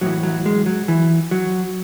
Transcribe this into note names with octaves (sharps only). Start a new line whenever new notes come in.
A2 E3 F#3
F#3
G#3
F#3
E3
F#3